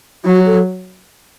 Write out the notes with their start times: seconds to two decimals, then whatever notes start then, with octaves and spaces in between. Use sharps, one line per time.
0.25 F#3 F#4
0.46 A4